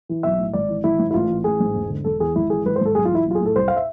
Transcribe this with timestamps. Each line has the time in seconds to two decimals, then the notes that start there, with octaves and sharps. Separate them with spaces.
0.09 E3
0.23 B1 E5
0.39 A2
0.53 G#1 D5
0.69 E3
0.84 G#1 E4
0.99 G#2
1.11 E4
1.14 A1 F4
1.29 E3
1.44 A1 G#4
1.60 G#2
1.75 E1
1.89 D3
2.04 E1 A4
2.20 E2 G#4
2.35 G#1 E4
2.50 E3 G#4
2.65 G#1 B4
2.76 C5
2.81 G#2 A4
2.95 B1 G#4
3.05 F4
3.11 E3 E4
3.26 B1 F4
3.35 G#4
3.40 A2
3.46 A4
3.56 C2 C5
3.68 F5
3.76 E5